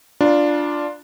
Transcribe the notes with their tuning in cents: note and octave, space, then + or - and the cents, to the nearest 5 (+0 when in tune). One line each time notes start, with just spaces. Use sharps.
D4 +0 F4 +0 B5 -45